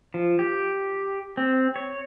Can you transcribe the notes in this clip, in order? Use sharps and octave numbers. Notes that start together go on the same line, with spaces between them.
F3
G4
C4
C#5